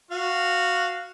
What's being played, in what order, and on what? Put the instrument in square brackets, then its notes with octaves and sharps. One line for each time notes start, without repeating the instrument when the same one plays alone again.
[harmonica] F#4 F5